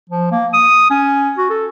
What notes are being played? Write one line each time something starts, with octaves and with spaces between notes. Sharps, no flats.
F3
A#3
D#6
C#4
F#4
A4